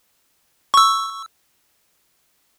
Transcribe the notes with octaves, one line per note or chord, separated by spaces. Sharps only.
C#6 E6